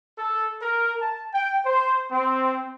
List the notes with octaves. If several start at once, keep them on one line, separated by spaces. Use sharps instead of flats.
A4
A#4
A5
G5
C5
C4